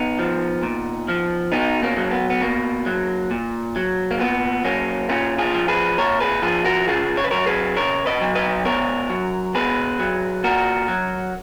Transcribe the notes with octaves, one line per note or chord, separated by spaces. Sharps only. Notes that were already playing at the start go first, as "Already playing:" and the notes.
Already playing: B3 D#4
F3
A#2
F3
B2 B3 D#4
A#3 C#4
F#3
B3
B3
B2 A#3
F#3
A#2
F#3
A#3
A#2 B3
F#3 A#3 C#4
A#2 C#4 F4
F4 G#4
F3
G#4 B4
A#2 A#4 C#5
G#4 B4
F3 F4 G#4
F#4 A#4
C#3 F4 G#4
C#5
B4
F#3 A#4 C#5
G#4 B4
C#3 A#4 C#5
B4 D#5
F#3
B4 D#5
B2 A#4 C#5
F#3
B2 G#4 B4
F#3
A#2 F#4 A#4
F#3